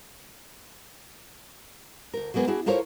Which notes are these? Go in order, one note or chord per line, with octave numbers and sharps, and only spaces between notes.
D2 A#4
F#3 G#3 A#3 B3 G#4
D4 E4 F#4 G#4
E4 F4 A4 A#4 C5 C#5